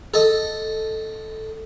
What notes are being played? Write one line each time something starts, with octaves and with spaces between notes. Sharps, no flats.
A4 D#5